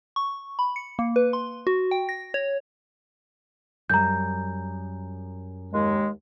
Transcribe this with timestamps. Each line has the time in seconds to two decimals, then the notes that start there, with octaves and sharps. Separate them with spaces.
0.16 C#6
0.59 B5
0.76 C#7
0.99 A#3
1.16 B4
1.33 C6
1.67 F#4
1.91 G5
2.09 A#6
2.34 C#5
3.90 F#2 G3 A#5 G6
5.72 D#2 G#3